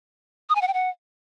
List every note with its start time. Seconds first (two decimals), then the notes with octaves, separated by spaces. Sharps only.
0.49 D#6
0.55 G#5
0.62 F#5
0.68 G5
0.74 F#5